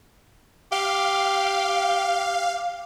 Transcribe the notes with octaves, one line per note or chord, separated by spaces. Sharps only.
G4 F5